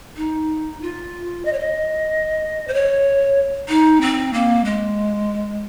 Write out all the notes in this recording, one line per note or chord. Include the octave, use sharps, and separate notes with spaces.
D#4
F4
D#5
C#5
D#5
C5
C#5
D#4
C4
A#3
G#3